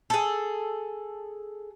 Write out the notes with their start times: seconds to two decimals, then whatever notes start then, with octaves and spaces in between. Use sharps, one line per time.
0.10 G#4 A4